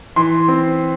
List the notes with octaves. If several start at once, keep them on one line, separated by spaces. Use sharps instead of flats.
E3 C6
C4